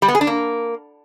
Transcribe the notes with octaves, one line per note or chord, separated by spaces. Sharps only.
G3
B3
G#4
D4
A#3